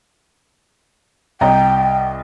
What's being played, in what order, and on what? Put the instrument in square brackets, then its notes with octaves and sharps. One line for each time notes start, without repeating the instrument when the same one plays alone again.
[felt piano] C2 D#5 A#5 [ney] G5